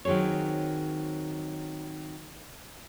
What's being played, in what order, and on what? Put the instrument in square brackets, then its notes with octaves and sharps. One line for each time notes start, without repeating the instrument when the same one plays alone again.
[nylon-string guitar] D#3 F#3 C4 G#4 C#5